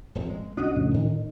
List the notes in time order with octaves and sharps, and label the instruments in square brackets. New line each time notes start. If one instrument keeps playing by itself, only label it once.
[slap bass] D#1 G#1 F2
G#3
[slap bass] C2 C#4 D4 [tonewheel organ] F#4 D#5
[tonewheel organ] F2 A2 C#3
[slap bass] A2 [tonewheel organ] D#3